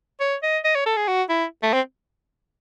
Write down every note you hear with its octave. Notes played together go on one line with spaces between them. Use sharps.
C#5
D#5
D#5
C#5
A4
G#4
F#4
E4
A3
C4